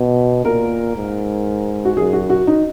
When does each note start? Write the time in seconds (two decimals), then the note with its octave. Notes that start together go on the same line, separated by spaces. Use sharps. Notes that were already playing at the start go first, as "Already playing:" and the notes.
Already playing: B2
0.45 A#2 A#4
0.96 G#2
1.85 F#4
1.96 F#2 G#4
2.13 F#4
2.30 F#4
2.47 D#4